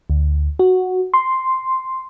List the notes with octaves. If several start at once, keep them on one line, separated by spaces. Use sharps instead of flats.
D2
F#4
C6